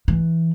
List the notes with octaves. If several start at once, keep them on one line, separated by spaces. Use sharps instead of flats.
E3